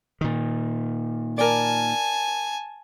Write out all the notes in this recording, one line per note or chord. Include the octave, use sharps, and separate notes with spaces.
A#2 D#3
A#4 D5 G#5 A5